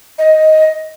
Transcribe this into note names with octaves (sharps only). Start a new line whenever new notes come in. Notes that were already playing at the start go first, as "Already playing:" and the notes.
D#5